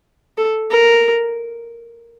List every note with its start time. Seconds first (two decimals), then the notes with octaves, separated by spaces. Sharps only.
0.38 A4
0.71 A#4